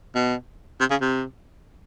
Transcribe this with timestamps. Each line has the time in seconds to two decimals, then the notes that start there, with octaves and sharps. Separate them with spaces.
0.15 B2
0.80 C3
0.91 C#3
1.01 C3